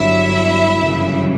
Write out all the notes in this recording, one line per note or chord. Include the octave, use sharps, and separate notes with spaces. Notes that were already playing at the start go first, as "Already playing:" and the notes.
Already playing: G1 G2 F#3 E4 E5
G1 F#2 C#3 E3